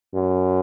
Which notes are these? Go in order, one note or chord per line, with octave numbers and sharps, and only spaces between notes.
F#2